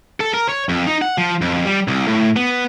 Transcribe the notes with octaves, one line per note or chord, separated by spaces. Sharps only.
A4
A#4
C#5
F2
D#4
F#5
F3
F2
G3
C2
A2
B3